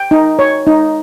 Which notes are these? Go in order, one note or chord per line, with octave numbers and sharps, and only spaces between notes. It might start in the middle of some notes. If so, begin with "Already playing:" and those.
Already playing: G5
D#4
C#5
D#4